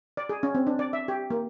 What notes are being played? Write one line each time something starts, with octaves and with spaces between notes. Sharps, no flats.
D5
G#4
C#4
C4
D4
D5
E5
G4
A#3